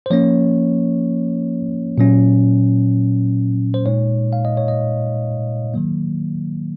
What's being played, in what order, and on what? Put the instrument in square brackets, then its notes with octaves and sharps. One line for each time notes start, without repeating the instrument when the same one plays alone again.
[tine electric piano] C5
F3 A#3 C#4 C#5
A#2 F#3 C#4
C5
A#2 G#3 D#4 C#5
F5
D#5
C#5
D#5
D#3 F#3 A#3